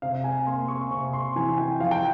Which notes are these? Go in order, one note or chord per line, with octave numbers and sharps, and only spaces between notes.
C3 F5
G#5
A#3 C6
C#6
C3 C#6
C6
E3 G#5
G5
F3 F5
G5